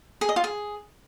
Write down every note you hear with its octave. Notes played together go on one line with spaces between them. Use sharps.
G#4
D#5
F4
G#4